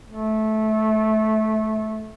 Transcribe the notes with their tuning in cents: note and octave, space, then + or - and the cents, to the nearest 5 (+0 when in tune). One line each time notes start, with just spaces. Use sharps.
A3 -15